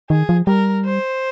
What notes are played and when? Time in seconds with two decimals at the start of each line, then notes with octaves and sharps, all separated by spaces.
0.10 D#3 G#4
0.29 F3
0.47 G3 A#4
0.85 C5